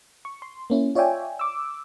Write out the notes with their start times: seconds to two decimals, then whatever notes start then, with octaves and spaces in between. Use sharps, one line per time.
0.25 C#6
0.42 C6
0.70 A#3 C#4 E4
0.95 F4 C#5 D5 E5 G5 G#5
1.39 D6 E6